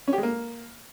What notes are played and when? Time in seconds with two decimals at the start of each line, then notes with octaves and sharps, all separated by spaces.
0.08 C#4
0.13 G4
0.18 G#3
0.23 A#3